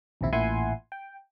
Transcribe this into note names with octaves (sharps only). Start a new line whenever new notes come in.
A#1 D#2 C3 E4
A1 A#2 E4 F#5 G#5 C6
G5